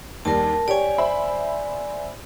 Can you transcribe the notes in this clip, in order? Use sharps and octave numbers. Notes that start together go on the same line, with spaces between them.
D#2 G3 A#4 A5
G4 C#5 D5 G#5
C5 E5 B5